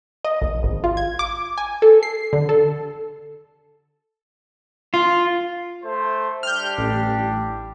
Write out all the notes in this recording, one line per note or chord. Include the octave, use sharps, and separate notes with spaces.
D#5
A#1
G#1
F4
G#6
D6
G#5
A4
C7
D3
A4
F4
A3 C5
G3 D4 G4 F6 G6
A1